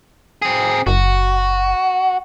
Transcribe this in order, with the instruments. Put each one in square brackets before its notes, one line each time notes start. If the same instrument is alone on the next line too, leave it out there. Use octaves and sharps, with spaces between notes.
[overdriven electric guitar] C4 G#4
[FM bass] F#1 [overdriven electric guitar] F#4